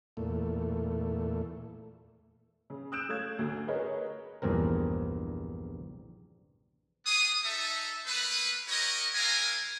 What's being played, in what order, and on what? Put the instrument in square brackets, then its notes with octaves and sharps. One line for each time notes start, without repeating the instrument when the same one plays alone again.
[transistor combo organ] E2 A#2 A3
[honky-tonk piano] C#3
D#6 E6 F#6 G6 D7 E7
A3 C#4 F5 G#6
D2
G#4 A#4 B4 C#5 D#5
[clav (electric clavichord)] A#1 E2 G2 C4 A#4
[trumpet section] B3 G#4 D5 D#6
D#4 A4 E5
A3 A#3 A4 B4
E4 F#4 G4 A#4 C#5 D#5
G#3 D4 E4 A#4 F5 G#5